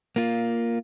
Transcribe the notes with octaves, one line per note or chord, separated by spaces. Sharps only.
A#3 F4